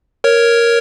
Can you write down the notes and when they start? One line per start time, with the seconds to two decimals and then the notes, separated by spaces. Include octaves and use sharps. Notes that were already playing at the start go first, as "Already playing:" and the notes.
0.24 A#4 C#5